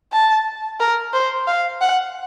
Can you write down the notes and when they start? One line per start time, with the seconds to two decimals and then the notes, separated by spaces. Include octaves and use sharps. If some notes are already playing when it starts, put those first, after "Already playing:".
0.12 A5
0.80 A#4
1.13 C5
1.47 F5
1.81 F#5